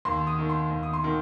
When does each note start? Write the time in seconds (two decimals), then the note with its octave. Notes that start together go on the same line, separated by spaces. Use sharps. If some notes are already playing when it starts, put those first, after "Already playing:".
0.05 D#2 C6
0.27 D#6
0.39 D#3
0.49 C6
0.71 D#2
0.83 D#6
0.93 C6
1.04 D#3